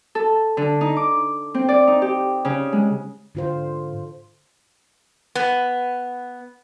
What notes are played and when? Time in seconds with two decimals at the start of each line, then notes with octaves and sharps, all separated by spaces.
0.15 A4
0.57 D3
0.81 D#4
0.97 D6
1.55 C4
1.69 D5
1.87 D#4
2.02 G4
2.45 C#3
2.73 G#3
3.35 G#2 D3 F4 C5
5.35 B3